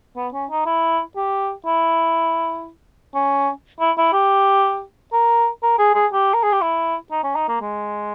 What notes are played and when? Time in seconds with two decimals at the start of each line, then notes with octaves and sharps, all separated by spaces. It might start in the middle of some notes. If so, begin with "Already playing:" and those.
0.16 B3
0.34 C#4
0.51 D#4
0.66 E4
1.16 G4
1.66 E4
3.15 C#4
3.80 E4
3.98 E4
4.13 G4
5.13 A#4
5.63 A#4
5.79 G#4
5.95 G#4
6.13 G4
6.34 A#4
6.43 G#4
6.53 G4
6.61 E4
7.11 D#4
7.24 C#4
7.35 D#4
7.48 A#3
7.61 G#3